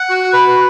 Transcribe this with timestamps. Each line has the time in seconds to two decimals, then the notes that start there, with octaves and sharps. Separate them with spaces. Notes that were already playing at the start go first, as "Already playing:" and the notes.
Already playing: F#5
0.10 F#4
0.33 B4